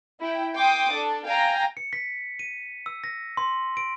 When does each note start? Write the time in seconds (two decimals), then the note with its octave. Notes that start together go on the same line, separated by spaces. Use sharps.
0.20 E4 G5
0.56 G5 C6 D6 D#6
0.92 D4 A4
1.25 F5 G5 G#5 A#5
1.77 C#7
1.93 B6
2.39 D#7
2.86 E6
3.04 A#6
3.37 C6
3.77 D7